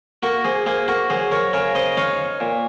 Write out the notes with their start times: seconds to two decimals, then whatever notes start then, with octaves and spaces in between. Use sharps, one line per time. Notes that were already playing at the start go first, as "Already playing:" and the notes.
0.23 A#3 F#4 A#4
0.44 G#4 C5
0.66 A#3 G#4 C5
0.88 F#4 A#4
1.10 F#3 G#4 C5
1.31 A#4 C#5
1.53 C#3 A#4 C#5
1.75 C5 D#5
1.97 D#4 C#5 F5
2.40 A#2